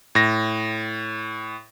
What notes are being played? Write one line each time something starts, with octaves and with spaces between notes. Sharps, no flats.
A2 A#6